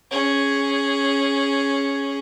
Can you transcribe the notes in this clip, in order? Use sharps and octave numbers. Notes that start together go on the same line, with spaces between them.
C#4 G#4